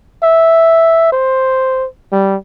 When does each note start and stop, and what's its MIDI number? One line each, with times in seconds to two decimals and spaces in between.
0.23 1.08 76
1.12 1.87 72
2.12 2.35 55